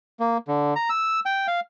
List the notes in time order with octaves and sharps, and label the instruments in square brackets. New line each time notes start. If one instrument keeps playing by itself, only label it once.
[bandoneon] A#3
D3
A#5
E6
G5
F5